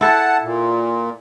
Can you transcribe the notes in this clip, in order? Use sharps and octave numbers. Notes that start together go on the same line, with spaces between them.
E4 A4 F#5 A5
A#2